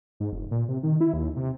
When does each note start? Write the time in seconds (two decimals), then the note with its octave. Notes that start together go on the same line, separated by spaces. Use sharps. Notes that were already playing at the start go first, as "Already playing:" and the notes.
0.20 G#2
0.32 F1
0.51 A#2
0.68 C3
0.83 D#3
1.01 E4
1.13 D#2
1.36 C3